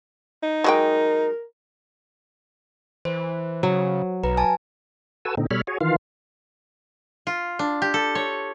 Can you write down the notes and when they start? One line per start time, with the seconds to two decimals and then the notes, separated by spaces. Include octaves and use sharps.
0.43 D#4
0.64 F#3 G#3 A#4 G5
3.05 E3 C5
3.63 C#3 F#3
4.23 B1 B4 A#5
4.37 G#5 A5
5.25 F#4 A4 B4 G#5 A5 E6
5.37 A#2 D3 C4 D#4
5.51 B2 G3 A4 C#5 B5 F6
5.67 F#4 G#4 C#5
5.81 D#3 E3 F4 F5
7.27 F4
7.59 D4
7.82 G4
7.94 A4
8.15 C#5